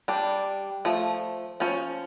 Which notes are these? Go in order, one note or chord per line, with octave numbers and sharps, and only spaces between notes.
G3 D4
F3 A3
F3 C#4